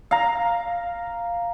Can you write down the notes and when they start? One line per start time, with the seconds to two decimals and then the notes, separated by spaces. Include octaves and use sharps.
0.11 F5 A#5